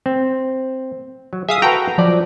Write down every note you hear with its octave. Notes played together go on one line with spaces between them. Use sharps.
C4
F#3
G#4 E5 F5 D#6
F#4 A4 B4 G5 A#5
F3 F#3 D5